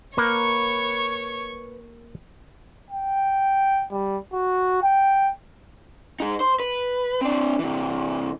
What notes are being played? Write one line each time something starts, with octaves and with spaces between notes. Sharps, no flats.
A#3 B4 C#5 C#6
G5
G3
F#4
G5
D#4 G#4
C5
B4
C4 D4
C3 E3